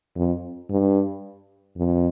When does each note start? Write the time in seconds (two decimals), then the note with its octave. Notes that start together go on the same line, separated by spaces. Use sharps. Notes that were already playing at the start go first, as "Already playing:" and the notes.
0.16 F2
0.69 G2
1.76 F2